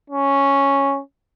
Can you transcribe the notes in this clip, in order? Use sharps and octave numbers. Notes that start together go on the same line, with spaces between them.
C#4